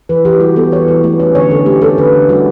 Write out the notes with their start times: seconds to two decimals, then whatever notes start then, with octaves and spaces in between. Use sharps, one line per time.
0.09 E3 B4
0.25 E3 G4
0.40 G3 F#4
0.56 B3 A4
0.72 E3 C#5
0.88 E3
1.04 A3
1.20 C#4
1.35 D3 C#5
1.51 D3 A4
1.66 A3 G4
1.82 C#4 A4
1.98 D3 B4
2.14 D3
2.29 G3 F#4